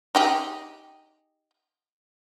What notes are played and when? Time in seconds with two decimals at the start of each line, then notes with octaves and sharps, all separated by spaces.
0.15 D#4 G4 G#4